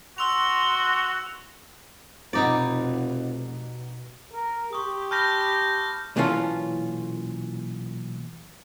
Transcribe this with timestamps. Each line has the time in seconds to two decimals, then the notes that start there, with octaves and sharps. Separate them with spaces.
0.18 F#4 C6 E6 F7
2.33 F1 B2 D#4 D5
4.33 A#4
4.73 G4 C6 C#6 D#6
5.11 A5 B5 F6 G6 A#6
5.42 B5
6.16 B1 A#2 E3 C#4 F4 A4